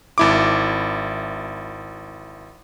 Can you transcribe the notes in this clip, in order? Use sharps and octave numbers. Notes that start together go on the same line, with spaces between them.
G#1 E4 D6